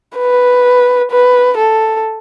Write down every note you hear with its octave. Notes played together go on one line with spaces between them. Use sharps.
B4
B4
A4